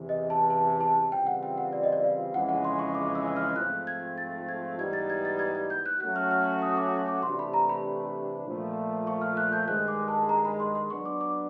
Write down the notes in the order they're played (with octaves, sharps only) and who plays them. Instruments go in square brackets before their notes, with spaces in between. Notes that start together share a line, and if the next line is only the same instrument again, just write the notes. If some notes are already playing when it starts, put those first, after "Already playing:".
Already playing: [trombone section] E2 C3 E3
[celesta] D#5
A5
A5
A5
[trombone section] C#3 E3 G3 C4 F4 [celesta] G5
[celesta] F#5
G5
F#5
D5
D#5
D5
F5
[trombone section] F2 C#3 E3 G#3 C#4 [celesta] F#5
[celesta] F#5
C6
C#6
D6
E6
F6
[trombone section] G#2 F3 A3 C4 F4 [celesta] F#6
[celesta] G#6
A6
G#6
[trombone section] G#2 E3 G3 B3 D#4 [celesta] G#6
[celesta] A6
G#6
A6
G#6
G#6
G6
F#6
[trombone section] F#3 A3 C#4 F#4 [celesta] F#6
[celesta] F6
F6
D#6
D6
D6
[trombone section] C3 E3 A3 D4 G4 [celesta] C6
[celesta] B5
A#5
B5
[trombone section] A#2 F3 A3
[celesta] C#6
F6
F#6
G6
[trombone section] G2 D#3 G#3 [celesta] F#6
[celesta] D6
A5
A#5
B5
C6
C6
[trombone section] F#3 B3 D4 [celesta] C#6
[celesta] D6
D6